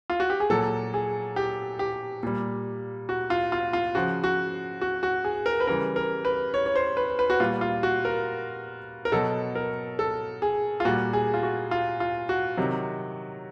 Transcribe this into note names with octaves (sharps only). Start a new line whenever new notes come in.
F4
F#4
G4
G#4
A#2 F#3 A4
G#4
G4
G4
A#2 G3
F#4
F4
F4
F4
C#3 F3 F#4
F#4
F#4
F#4
G#4
A#4
B4
C#3 E3 G3 A#4
A#4
B4
C#5
C#5
C5
B4
B4
F#4
A#2 G3 F4
F4
F#4
A#4
A#4
B2 F#3 A4
A#4
A4
G#4
F4
A#2 G3 F#4
G#4
F4
F#4
F4
F4
F#4
C3 D#3 F#3